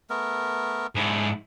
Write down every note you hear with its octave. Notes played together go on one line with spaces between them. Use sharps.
A3 B3 A#4
G#2 D4 E4 G#4